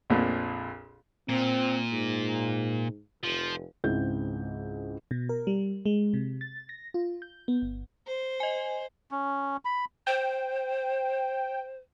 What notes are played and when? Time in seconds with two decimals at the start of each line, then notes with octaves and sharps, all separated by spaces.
0.10 A#1 F2 A#2
1.29 A#2 C4
1.92 G#2
3.23 F1 F3
3.84 C#2 G#2 C4 E4 G6
5.11 B2
5.29 A#4
5.47 G3
5.85 G#3
6.14 C3
6.41 A6
6.69 A#6
6.94 F4
7.22 G6
7.48 B3
7.62 G1
8.07 C5
8.40 D#5 G#5
9.11 C#4
9.65 B5
10.07 C5 G5